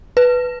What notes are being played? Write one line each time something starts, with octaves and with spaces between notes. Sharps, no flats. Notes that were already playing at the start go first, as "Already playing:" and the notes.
B4